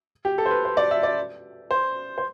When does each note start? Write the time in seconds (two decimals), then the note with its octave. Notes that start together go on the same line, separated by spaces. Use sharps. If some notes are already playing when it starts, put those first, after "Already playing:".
0.25 G4
0.38 A4
0.46 C5
0.51 B4
0.65 C5
0.77 D5
0.91 E5
1.03 D5
1.71 C5
2.18 C5